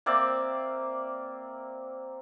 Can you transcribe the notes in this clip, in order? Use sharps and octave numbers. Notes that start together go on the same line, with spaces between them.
A#3 C4 D5 E5